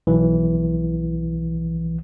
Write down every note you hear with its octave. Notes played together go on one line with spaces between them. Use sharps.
B1 E3